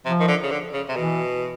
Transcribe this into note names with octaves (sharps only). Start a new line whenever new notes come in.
C3 F3
D#3
D3
C#3
D3
C#3
C3
B2 E3